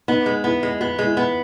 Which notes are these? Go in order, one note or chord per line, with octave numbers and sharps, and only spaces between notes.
B3 D#4
G#3
B3 E4
G#3
B3 F4
G#3
E4
B3